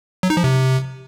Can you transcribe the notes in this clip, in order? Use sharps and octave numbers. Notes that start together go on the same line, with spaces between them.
F#3
D#4
F3
C3